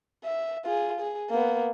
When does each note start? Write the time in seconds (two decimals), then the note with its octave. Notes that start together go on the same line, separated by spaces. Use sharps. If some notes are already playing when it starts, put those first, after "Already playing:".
0.24 E5
0.64 F4 G#4
1.00 G#4
1.30 A#3 B3